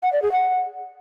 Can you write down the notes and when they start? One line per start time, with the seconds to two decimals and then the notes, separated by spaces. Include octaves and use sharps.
0.03 F#5
0.13 D5
0.22 G#4
0.32 F#5